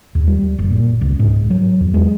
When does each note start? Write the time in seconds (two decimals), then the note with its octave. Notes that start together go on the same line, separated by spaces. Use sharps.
0.15 D#2
0.27 G3
0.58 F#1
0.70 A#2
1.01 C#2
1.19 G#2
1.50 F#3
1.80 E2
1.94 G#3